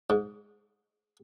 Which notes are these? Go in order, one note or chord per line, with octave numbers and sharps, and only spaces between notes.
G#2